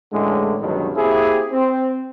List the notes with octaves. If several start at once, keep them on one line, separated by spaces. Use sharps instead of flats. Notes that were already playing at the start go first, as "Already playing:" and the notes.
A1 A2 D3 G#3
C#2 G2 B2 D3 D#3 F#3
A#3 C4 E4 G4 G#4
C4